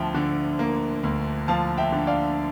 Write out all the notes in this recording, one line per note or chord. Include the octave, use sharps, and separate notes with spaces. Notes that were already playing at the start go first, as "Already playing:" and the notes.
Already playing: D2 F3 E5 G5 A5
D3
A#3
D2
F3 F5 A5
E5 G5
D3
D5 F5